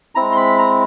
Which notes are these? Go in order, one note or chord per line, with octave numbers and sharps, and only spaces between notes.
G#3 C4 E4 A#5
C6
B5
A#5